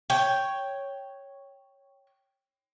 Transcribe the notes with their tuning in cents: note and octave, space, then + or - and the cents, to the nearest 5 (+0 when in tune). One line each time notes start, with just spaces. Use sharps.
C#5 +0 G5 +0